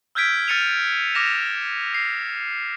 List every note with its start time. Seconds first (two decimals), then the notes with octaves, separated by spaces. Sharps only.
0.15 E6 F6 G6 G#6 B6 D7
0.48 F6 A6 C#7 D#7 F7
1.15 D6 F6 A#6 E7
1.94 C7